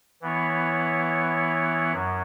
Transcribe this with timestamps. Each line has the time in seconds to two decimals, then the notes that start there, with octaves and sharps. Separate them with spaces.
0.22 E3 B3 E4 C#5
1.92 F#2 F#3